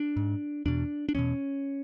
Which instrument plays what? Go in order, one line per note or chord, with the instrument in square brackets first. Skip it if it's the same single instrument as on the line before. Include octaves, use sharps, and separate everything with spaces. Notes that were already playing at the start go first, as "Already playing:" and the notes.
Already playing: [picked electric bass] D4
G#2
E2 B2 D4
D4
E2 B2 C#4